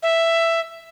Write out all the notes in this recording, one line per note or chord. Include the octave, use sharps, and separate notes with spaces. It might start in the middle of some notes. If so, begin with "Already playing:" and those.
E5